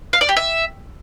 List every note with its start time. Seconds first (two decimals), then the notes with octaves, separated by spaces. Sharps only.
0.13 F5
0.21 D5
0.29 G4
0.37 E5